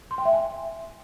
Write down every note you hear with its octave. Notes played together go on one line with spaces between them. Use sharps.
C6
G5
E5
G#5